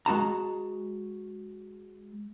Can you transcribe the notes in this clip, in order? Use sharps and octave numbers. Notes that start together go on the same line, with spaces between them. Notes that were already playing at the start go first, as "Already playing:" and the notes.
G#3 F#4 A5 A#5